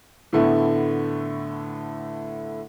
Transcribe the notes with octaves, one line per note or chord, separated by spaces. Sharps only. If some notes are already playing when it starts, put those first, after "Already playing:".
A2 D3 A3 B3